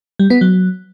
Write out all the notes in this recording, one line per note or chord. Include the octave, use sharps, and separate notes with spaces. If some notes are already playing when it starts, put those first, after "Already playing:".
G3
B3
F#3